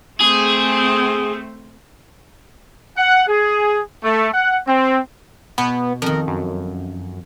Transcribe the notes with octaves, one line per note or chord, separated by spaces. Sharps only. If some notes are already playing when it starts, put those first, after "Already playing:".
A3 C4 G#4
F#5
G#4
A3
F#5
C4
B2 B3
F2 D#3 A#4
F#2